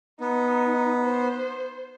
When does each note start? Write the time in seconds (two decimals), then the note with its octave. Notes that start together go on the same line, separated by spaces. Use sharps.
0.21 B3 D#4
1.04 C5